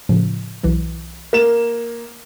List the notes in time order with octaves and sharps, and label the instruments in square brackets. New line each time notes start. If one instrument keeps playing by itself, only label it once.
[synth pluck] A2 C#3 F3
B1 E3 F#3
[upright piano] A#3 E7 [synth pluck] A#4